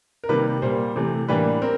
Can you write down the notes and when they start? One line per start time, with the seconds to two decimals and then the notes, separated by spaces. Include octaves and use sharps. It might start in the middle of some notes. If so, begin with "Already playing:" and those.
0.24 A#4
0.29 C3 D#3 G3 A#3 B4
0.62 A#2 G3 A#3 C5
0.96 C3 E3 A3
1.28 A2 E3 G3 A#3 D4 B4
1.62 C4 A#4